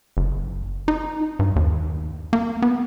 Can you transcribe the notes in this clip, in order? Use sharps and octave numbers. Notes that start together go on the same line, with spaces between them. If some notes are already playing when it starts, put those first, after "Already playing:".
F#1
D#4
G2
D#2
A#3
B3